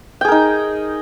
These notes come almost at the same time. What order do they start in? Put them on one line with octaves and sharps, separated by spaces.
G5 G#4 A#4 D#4